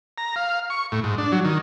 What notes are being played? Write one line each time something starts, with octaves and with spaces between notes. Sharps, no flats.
A#5
F5
C#6
A2
G#2
D4
F#3
D#3